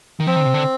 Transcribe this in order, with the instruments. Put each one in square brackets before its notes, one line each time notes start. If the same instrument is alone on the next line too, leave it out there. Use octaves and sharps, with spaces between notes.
[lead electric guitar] D#3
[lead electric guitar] F3 [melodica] C4
[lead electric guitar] D#3
D3
C3
D3